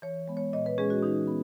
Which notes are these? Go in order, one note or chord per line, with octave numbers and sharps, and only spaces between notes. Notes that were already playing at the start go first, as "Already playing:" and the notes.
E3 C#5
G#3 B3
C#5
A#2 D#5
B4
G#3 C#4 G#4
F#4
E3 D#4
B3